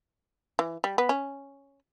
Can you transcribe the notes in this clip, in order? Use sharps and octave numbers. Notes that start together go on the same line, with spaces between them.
E3
G3
B3
C#4